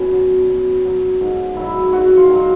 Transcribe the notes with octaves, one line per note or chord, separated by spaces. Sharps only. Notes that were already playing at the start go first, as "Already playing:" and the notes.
Already playing: B2 C#4
F#3
B2
F#3
G#2
D#3 F#3 E4
G#2 F#4
F4
D#3 F#3